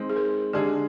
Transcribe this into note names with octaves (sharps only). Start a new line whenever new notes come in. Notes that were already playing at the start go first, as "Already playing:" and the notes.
Already playing: G#3 C4 D#4
G#4
A#4
D3 G#3 D4 G4 G#4